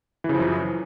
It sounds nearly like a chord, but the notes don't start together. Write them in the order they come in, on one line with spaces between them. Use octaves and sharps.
E3 C#3 F3 F#2